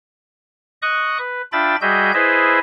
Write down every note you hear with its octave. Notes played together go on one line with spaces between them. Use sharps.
D#5 C#6 D#6 F#6
B4
D4 F4 E5 G5 B5 A6
G3 F#4 G#4 D#5 E5 G6
E4 G#4 B4 C5 D#5 E5